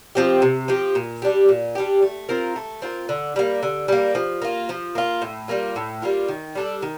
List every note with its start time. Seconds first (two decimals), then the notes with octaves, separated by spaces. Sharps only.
0.15 F3 C4 G4
0.42 C3
0.68 F3 C4 G4
0.95 A#2
1.22 G3 D4 G4
1.49 A#2
1.75 G3 D4 G4
2.02 A3
2.29 C4 F4 A#4
2.56 A3
2.82 C4 F4 A#4
3.09 D3
3.36 G3 A#3
3.63 D3
3.88 G3 A#3
4.15 F3
4.42 A#3 F4
4.69 F3
4.95 A#3 F4
5.22 A2
5.48 G3 A#3 F4
5.76 A2
6.02 G3 A#3 F4
6.28 D#3
6.55 G3 D4 A4
6.82 D#3